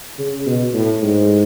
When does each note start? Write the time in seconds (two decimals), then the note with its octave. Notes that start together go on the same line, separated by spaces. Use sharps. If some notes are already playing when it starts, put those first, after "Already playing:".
0.19 C#3
0.46 B2
0.74 A2
1.02 G#2